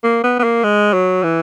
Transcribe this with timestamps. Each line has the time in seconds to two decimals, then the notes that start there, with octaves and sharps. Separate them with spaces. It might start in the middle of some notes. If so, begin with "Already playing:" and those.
0.04 A#3
0.24 B3
0.39 B3
0.44 A#3
0.63 G#3
0.93 F#3
1.23 E3